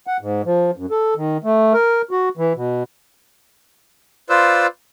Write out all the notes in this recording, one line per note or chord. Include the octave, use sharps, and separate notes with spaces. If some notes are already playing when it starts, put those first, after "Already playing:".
F#5
G#2
F3
F#2
A4
D#3
A3
A#4
F#4
E3
B2
F4 B4 C5 D5 E6